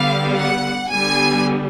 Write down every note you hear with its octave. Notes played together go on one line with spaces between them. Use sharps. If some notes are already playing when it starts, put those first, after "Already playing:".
Already playing: D3 G3 B3 F5
F#5
D3 G3 B3 G#5